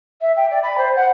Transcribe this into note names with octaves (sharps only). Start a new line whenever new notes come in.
E5
G5
D5
B5
C5
F#5